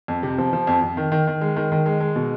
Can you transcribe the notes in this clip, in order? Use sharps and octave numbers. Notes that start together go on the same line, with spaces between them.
F2
C3
F3
F3
F2
F2
D#3
D#3
D#3
G#3
D#3
D#3
G#3
G#3
B2